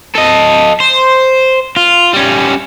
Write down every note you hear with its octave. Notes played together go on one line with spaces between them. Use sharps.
A4 D#5
C5
F4
G3 C#4